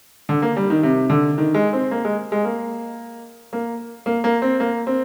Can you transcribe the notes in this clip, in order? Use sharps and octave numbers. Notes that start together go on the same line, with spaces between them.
D3
A#3
G3
D#3
C3
D3
D#3
G#3
C4
A#3
G#3
G#3
A#3
A#3
A#3
A#3
C4
A#3
C4